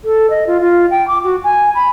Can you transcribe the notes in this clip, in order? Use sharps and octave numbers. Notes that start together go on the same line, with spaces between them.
A4
D#5
F4
F4
G5
D6
F#4
G#5
B5